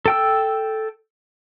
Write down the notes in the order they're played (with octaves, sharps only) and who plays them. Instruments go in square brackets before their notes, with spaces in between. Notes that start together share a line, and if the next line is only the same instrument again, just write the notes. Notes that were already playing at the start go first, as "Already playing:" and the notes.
[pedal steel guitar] A4 G5 E6